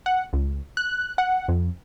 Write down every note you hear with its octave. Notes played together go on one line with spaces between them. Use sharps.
F#5
C#2
F#6
F#5
F2